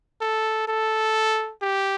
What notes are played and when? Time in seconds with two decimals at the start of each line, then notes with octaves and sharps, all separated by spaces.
0.21 A4
0.68 A4
1.62 G4